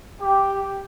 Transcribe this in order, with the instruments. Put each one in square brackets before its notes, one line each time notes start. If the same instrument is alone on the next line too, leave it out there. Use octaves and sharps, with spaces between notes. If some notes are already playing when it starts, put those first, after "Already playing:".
[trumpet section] G4